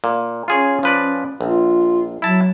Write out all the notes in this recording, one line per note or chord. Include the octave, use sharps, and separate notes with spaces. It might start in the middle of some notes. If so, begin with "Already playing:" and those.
A#2
C#4 F4 G#4 C#5
F3 B4 D5
A#1 F4
F#3 E4 A5